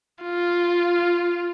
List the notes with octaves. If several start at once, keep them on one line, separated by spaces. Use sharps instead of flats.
F4